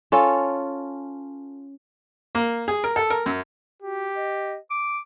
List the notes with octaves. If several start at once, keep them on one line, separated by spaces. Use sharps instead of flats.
C#4 F4 A4
A#3
G#4
A#4
A4
A#4
F#2
F#4 G4
D#5
D6